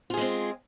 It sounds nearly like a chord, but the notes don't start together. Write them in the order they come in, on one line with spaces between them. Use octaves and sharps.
F4 G#4 G#3 C4